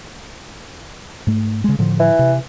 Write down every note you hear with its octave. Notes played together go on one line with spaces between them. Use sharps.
G#2 A3
C#3 G#3
A2 D3 F3
E3
C3